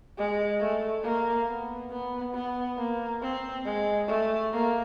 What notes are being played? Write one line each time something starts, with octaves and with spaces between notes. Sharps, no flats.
G#3
A3
A#3
B3
B3
B3
A#3
C4
G#3
A3
A#3